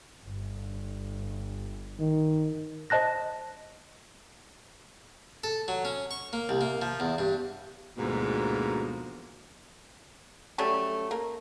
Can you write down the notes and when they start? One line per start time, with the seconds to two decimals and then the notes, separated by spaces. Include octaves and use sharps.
0.25 G1
2.00 D#3
2.90 C5 D#5 A5 F#6 A#6
5.44 A4
5.68 F#3
5.85 C#4
6.11 C#6
6.33 A#3
6.49 C2
6.61 A#3
6.82 F3
7.00 E2
7.18 G2
7.98 D2 G#2 B2 E3 F3 A#3
10.58 F#3 G3 A3 C#4
11.11 A#3